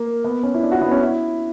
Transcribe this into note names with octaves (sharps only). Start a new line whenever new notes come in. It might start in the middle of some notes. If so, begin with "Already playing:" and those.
Already playing: A#3
B3
C#4
E4
D4
F#4
B3
C#4
E4